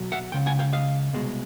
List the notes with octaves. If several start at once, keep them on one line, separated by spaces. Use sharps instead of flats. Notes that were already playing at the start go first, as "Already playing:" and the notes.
Already playing: B1 B2 F#3
E5 F#5
C#2 C#3 G5
F#5 G#5
F5 G5
D#5 F5
C2 B2 G#3